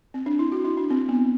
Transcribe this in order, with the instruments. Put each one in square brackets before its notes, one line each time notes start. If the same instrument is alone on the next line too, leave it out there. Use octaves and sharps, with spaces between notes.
[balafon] C4
D4
E4
F#4
E4
D4
C4
B3